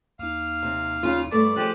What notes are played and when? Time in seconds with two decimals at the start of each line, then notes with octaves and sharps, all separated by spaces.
0.19 D#2 D#4 F5
0.63 C3
1.03 C#3 F4
1.31 G2 A3 D5
1.56 F3 G#3 G4 F#6